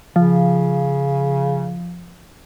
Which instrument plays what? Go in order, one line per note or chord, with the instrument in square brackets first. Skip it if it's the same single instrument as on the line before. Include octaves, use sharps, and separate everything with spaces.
[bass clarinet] C#3 [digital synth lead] F3